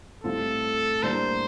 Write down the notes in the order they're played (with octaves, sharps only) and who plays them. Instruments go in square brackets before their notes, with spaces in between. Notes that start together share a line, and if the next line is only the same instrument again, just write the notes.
[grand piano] A2 G3 C4 F4 [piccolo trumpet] A4
[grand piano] A2 G3 A#3 D4 [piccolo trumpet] C5